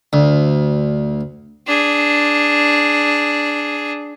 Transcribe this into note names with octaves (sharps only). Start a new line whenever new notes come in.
D2
D4 G#4